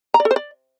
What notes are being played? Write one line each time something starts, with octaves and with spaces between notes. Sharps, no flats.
A#5
D5
A4
C5
D5